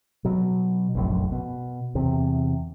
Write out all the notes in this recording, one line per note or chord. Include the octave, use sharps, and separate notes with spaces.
B2 F#3
F1 A#1 F#2
B2
E2 C3